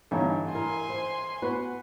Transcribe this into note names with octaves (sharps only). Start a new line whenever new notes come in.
G2 D3 E3 D#4 C#5
E4 A#4 G#5 C6
C5
B3 F#4 B4